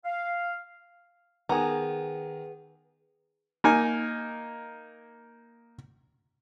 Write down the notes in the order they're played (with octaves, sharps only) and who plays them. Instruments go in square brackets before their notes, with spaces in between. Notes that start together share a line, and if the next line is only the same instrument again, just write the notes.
[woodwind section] F5
[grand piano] D#3 A#5 [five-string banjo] B3 G#4
[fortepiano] A#3 D#4 G#5